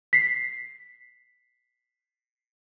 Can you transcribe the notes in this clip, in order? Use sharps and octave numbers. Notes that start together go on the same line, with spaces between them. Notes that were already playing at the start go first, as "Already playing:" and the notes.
B6 C7